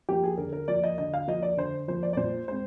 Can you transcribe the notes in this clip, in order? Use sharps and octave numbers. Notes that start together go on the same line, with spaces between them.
F3 A#3 G4
G#4
D3 A#4
A#4
F3 A#3 D5
D#5
D3 D#5
F5
F3 A#3 D#5
D5
D3 C5
F3 A#3 C5
D5
D5
A#2 C5
G#3 C4 C5